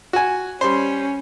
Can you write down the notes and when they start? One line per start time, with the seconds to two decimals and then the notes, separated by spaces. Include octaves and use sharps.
0.13 F#4 G#5
0.61 G3 C#4 C5